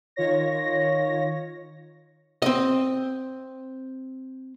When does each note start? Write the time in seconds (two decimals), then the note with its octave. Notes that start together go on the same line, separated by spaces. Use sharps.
0.16 D#3 F4 C#5 A#6
2.42 C4 D#5